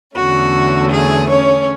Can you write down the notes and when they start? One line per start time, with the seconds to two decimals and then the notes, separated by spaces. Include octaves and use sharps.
0.15 E2 D3 A3 C#4 F#4
0.92 G#4
1.29 C#4 C#5